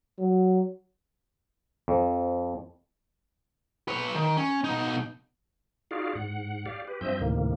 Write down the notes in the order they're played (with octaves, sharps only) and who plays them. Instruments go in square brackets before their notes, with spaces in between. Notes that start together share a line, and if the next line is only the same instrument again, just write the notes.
[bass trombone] F#3
[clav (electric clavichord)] F2
[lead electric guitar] B4 C#5
D#3
C#4
B2 D#4
[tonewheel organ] D#4 F4 F#4 G#4 D5 F5
G#2 F#5
G4 D5 F5
G4 B4
G2 F3 C4 D#5 E5 G6
D2 A2 C3 D#3 A#3